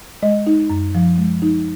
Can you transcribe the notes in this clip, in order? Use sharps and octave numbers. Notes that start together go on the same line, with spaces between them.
G#3 D#5
D#4
F#2
F3
G#3
D#4